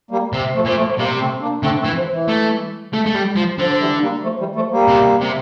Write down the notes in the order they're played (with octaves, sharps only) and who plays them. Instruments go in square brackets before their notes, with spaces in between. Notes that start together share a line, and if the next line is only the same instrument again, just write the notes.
[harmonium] G3 A#3
[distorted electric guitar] C3
[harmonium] F3 A3
[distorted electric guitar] A#2
[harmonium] F3 A3
[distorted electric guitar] C3 [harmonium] G3 A#3
[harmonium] A3 C4
A#3 D4
[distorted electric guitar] D3 [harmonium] A3 C4
[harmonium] A3 C4
[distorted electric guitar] E3
[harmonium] F3
E3
[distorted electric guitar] A3
A3
A3
G3
F3
[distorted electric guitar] D3 [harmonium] F3
[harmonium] E3 G3
G3 A#3
F3 A3
E3 G3
F3 A3
G3 A#3
[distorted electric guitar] C3
C3